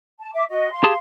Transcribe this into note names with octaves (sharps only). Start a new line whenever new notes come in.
A5
E5 D6
F#4 D#5
F5 C6
G4 G#4 A5